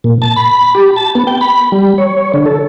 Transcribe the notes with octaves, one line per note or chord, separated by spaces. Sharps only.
A#2
A5
B5
G4
A5
B3
G5
B5
G3
C#5
D3
A4